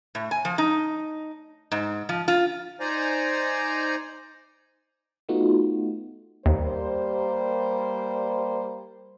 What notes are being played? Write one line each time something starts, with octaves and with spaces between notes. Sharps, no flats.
A2
G#5
F3
D#4
G#2
F3
F4
D#4 C5 D5 G#5 A#5
A3 B3 D#4 F4 F#4
D#2 G3 A#3 C5